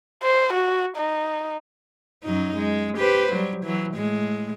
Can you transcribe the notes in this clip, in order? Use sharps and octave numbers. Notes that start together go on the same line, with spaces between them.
C5
F#4
D#4
F#2 F#3 D#4
G#3
G4 B4 C5
F#3 G3
E3 F#3
A2 G#3